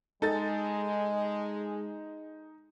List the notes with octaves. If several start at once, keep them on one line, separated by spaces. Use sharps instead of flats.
G#3 D#4 A4 A6